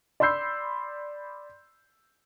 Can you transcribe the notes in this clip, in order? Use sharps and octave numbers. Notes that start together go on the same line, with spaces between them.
D5 B5 C6 E6 G6 C7